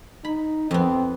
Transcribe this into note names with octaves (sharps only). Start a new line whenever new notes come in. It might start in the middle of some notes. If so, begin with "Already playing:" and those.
D#4 B5
F2 B3 C4